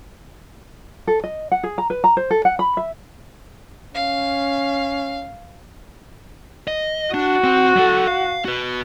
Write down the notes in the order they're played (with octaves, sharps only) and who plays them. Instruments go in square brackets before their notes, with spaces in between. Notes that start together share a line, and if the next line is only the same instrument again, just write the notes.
[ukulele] A4
D#5
F#5
G#4
A#5
B4
A#5
C5
A4
F#5
B5
E5
[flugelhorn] C#4 [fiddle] F5
[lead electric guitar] D#5
[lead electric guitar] D4 [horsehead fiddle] F#4
[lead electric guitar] C4
F#3 A4
F5
F#4 B4